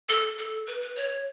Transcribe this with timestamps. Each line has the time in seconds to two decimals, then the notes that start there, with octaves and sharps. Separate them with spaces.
0.09 A4
0.39 A4
0.67 B4
0.82 B4
0.96 C#5